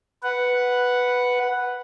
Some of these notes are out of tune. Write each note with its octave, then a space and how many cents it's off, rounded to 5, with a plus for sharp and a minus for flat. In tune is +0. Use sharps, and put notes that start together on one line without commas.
B4 +0 F#5 +0